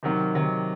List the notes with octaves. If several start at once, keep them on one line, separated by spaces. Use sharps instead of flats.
C3 D#3 F#3
C3 D#3 F#3